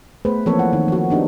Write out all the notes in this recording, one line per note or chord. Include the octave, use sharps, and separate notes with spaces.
A3 B3 G#4 B4 C5
E3 F3 A#3 C4 A4 C#5
F#5
D#3
F3 F#4
B3 D4 D#4 G4